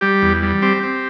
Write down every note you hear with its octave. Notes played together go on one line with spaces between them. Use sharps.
G3 G4
E2
G3
C4 G4
C4